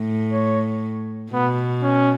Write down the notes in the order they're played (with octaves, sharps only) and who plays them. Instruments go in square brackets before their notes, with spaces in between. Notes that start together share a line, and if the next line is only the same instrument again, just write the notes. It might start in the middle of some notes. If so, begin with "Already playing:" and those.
Already playing: [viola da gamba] A2
[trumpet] C#5
[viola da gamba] B2 [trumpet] B3
[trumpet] C#4